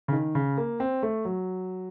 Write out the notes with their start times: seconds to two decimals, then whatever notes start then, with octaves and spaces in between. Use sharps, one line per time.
0.08 C#3
0.12 D#3
0.35 C#3
0.58 A#3
0.80 C4
1.03 A3
1.25 F#3